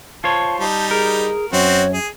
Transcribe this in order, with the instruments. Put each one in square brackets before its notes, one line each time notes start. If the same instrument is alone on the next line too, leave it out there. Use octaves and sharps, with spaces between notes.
[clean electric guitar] F4 C5 C#5 [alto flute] A5
[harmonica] G3 D#4 [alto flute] A5
[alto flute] G#4 [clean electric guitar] A#4
[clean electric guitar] F#2 [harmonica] C4 F#4 [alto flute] C#5
[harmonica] G#4